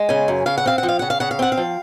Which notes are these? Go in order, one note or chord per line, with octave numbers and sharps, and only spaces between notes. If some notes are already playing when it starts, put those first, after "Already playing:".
Already playing: G#3
C#3 G#5
F#2
C#3 F5
F#5
C4 F5
F#5
F3
F5
C#3 F#5
F5
C#3 F#5
F5
C4 F#5
F5
F3